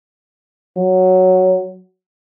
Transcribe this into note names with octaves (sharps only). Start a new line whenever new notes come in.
F#3